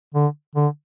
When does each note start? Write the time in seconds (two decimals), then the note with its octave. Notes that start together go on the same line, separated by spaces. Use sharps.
0.15 D3
0.55 D3